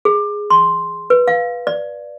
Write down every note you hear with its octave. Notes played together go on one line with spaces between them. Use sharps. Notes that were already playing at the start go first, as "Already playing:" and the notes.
G#4
C6
B4
F5
D5